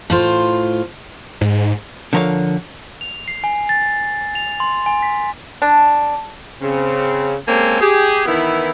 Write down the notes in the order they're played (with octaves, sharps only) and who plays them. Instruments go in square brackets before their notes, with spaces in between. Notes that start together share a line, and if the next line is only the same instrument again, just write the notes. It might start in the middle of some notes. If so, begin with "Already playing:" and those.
[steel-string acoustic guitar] A2 F4 C5
[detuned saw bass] G#2
[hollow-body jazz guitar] D3 F3 A#4 C#5 F5
[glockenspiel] F7
C7
G#5
A6
F7
C6
G#5
B6
[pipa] D4
[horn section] C#3 C4
G#3 A#3 C4 C#4 A4 G#5
G4 G#4
D#3 E3 B3 E4